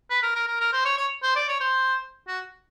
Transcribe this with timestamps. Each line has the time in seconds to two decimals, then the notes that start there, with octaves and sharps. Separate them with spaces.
0.10 B4
0.22 A#4
0.35 A#4
0.48 A#4
0.60 A#4
0.73 C5
0.85 C#5
0.98 C#5
1.23 C5
1.36 D5
1.48 C#5
1.60 C5
2.28 F#4